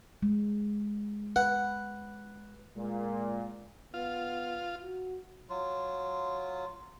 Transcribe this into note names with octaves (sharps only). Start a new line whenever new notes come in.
G#3
B4 F#5
A#2 G#3
B3 F4
F#4
F#3 F4